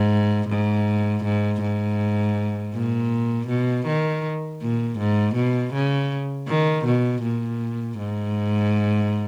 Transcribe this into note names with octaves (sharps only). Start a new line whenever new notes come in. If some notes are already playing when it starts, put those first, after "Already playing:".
Already playing: G#2
G#2
G#2
G#2
A#2
B2
D#3
A#2
G#2
B2
C#3
D#3
B2
A#2
G#2